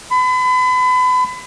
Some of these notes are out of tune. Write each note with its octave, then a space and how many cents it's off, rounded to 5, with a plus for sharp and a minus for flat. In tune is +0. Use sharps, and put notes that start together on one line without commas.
B5 +35